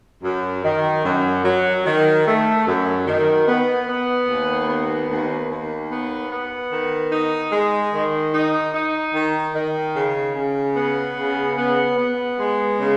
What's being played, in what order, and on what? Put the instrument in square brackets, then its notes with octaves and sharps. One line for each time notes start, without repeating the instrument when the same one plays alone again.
[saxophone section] F#2
D#3
F#2
F#3
D#3
A3
F#2
D#3
B3
B3
D#2
B3
D#2
D#2
B3
B3
D#3
D#4
G#3
D#3
D#4
D#4
D#3
D#3
C#3
C#3
B3
C#3
B3
B3
G#3
C#3